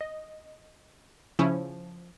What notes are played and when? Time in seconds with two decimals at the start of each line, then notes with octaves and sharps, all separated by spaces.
0.01 D#5
1.39 C#3 F3 C#4 E4